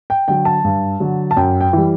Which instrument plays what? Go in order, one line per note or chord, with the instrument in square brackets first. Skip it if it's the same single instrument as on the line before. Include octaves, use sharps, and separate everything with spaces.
[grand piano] G5
D3 F#3 G5
A5
G2
D3 F#3
A5
F#2 G5
G5
E3 G3